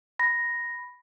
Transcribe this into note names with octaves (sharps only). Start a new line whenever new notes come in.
B5 A#6